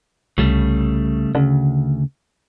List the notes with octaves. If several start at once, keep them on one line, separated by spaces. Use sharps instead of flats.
C2 C#3 G3 A3
D2 C#3